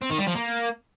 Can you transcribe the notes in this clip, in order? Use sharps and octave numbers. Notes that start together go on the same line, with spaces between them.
C4
D#3
G3
F3
A#3